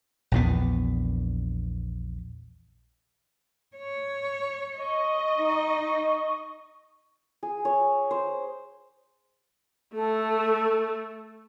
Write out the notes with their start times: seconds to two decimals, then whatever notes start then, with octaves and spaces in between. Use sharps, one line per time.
0.32 A#1 E2 B3
3.76 C#5
4.79 D#5 C#6
5.37 D#4
7.43 G#4
7.65 C#5
8.11 C5
9.94 A3 A4